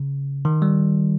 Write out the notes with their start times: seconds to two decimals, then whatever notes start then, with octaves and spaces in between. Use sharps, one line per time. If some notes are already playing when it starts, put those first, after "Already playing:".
Already playing: C#3
0.45 D#3
0.62 G3